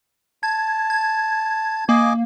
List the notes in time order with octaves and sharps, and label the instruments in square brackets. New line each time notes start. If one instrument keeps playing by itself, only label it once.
[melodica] A5 [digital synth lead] G#6
[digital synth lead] G#6
[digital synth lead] A#3 [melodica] D#5 G#5 D6